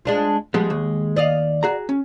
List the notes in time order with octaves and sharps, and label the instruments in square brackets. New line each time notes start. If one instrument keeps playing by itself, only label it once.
[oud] G#3 D4 F4
[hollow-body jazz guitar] F3 G3 B3 [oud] G#3
[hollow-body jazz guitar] D#2
[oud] D5 D#5 F5
[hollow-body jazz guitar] F#4 G#4 A#5
C#4